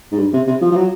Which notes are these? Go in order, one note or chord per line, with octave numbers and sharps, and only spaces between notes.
G#2
G2
C3
C3
F3
F3
F#3